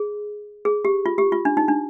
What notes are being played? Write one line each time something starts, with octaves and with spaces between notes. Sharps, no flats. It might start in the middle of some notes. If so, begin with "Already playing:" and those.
Already playing: G#4
G#4
G4
F4
G4
F4
D4
D#4
D4